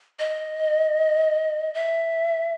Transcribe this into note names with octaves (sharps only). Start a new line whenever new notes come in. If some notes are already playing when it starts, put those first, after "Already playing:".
D#5
E5